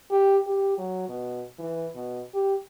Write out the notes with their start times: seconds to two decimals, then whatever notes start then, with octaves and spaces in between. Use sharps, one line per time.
0.11 G4
0.47 G4
0.78 F#3
1.09 B2
1.59 E3
1.96 B2
2.34 G4